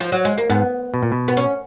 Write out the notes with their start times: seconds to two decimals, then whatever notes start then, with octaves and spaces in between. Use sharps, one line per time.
0.00 F3
0.12 F#3
0.25 G#3
0.38 A#3
0.50 G#2 B3
0.94 B2
1.03 A#2
1.12 B2
1.28 B3
1.37 C#4